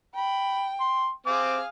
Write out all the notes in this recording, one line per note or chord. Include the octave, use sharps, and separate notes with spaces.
G5 B5
C6
C4 G#4 F5 D6